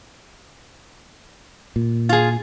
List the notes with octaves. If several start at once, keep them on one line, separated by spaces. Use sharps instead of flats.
A#2
F4 G#4